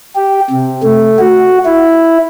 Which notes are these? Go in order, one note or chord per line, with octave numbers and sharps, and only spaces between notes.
G4
C3
A3
F#4
E4